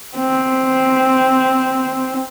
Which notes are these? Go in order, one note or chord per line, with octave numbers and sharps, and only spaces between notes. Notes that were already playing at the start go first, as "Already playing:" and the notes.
C4